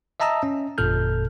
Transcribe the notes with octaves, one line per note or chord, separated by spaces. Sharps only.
D#5 E5 A5 A#5 D#6 E6
C#4
G1 F2 A#2 A4 F6 G6